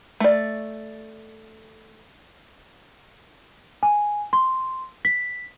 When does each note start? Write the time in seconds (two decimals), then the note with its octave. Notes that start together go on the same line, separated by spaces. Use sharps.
0.20 A3 D5
3.83 G#5
4.33 C6
5.05 B6